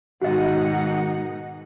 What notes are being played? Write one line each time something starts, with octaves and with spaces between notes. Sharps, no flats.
G#2 B2 D#3 G#3 D#4 F#4 D#5 F#5